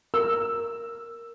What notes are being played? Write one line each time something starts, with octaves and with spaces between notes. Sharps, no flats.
A#4 E6